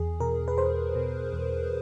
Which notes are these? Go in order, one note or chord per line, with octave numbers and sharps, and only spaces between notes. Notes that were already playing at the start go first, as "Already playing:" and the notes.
Already playing: E2 G#4
B2 A#4
B4
E2 C5
B2
E2